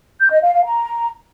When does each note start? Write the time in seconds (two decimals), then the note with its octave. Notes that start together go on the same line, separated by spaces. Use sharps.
0.20 G6
0.31 D#5
0.42 F5
0.53 F5
0.63 A#5